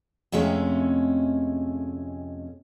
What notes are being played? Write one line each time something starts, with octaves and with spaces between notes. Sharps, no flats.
F2 C3 G#3 A3 C#4